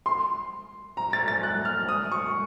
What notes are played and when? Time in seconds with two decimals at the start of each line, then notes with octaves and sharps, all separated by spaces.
0.06 C6
0.97 A#5
1.13 A6
1.28 A6
1.43 F#6
1.65 F6
1.89 D#6
2.12 C#6